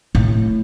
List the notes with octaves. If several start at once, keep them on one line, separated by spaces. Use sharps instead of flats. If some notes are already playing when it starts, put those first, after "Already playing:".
A2